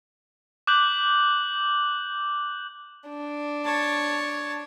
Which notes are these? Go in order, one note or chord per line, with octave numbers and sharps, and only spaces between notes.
D6 F#6 G6 F#7
D4
C#5 A5